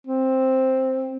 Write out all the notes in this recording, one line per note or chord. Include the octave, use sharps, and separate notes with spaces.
C4